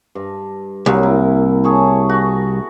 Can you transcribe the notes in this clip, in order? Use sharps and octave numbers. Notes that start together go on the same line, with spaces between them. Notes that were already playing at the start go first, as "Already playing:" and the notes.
G2
C2 F#3 A#3
E4
G#4 C#5 A5
F#4